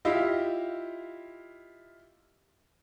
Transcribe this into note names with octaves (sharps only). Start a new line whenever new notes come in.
E4 F4 G4 D#5 F5